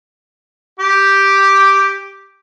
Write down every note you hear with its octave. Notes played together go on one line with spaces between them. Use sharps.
G4 D6